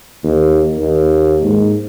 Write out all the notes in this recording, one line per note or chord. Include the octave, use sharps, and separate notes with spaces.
D#2
D#2
G#2